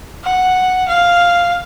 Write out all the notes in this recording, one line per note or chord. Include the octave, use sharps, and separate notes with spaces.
F#5
F5